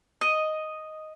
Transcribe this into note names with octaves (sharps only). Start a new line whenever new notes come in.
D#5